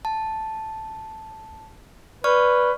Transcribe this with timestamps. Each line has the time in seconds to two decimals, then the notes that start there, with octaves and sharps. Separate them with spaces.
0.05 A5
2.24 B4 D5 C#6 F6